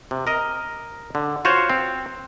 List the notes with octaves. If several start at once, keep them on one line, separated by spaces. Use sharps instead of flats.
C3
A#4 D#5
D3
F4 F#4 C5 C#5
C4